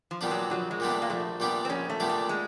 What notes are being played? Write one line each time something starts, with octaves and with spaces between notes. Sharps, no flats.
F3
A#2 G3 B3 D4
F#3
A#1 F#3
G#3
A#2 G3 B3 D4
A3
A#3
A#1 A3
A#2 G3 B3 D4
C4
A#1 C#4
A3
A#2 G3 B3 D4
A3
G#3